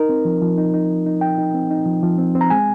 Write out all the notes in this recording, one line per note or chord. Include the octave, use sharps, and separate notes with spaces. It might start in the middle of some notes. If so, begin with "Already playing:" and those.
Already playing: D#4 A#4
C4
F3
F3
D#4
D#4
F3
D#4
D#4 G5
D#4
C4
D#4
F3
F3
C4
C4
A#5
G#3 G#5